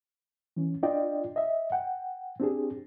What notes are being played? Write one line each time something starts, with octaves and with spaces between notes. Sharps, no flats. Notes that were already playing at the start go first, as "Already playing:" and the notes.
E3 C#4
D4 F4 D5 D#5 G5
D#5 E5
F#5 G5
C4 D4 G4 G#4